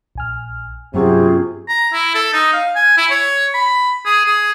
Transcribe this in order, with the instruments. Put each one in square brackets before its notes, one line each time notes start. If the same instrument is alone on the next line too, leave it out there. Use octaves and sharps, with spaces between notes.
[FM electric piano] A#1 G#5 F6
[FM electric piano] G2 F#3 F#4 [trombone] C3 [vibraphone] B3 C#4 F4 [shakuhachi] G#4
[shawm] A#5
E4
A4
D#4
F5
G#5
E4
C#5
B5
G#4
G#4